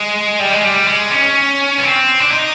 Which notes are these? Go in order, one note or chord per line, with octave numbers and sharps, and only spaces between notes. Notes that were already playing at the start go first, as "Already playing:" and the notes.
Already playing: G#3
G3
G#3
G3
G#3
C#4
B3
C4
D4
D#4